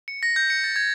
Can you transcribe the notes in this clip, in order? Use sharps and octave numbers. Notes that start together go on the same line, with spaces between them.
C#7
A#6
G6
C#7
A6
G#6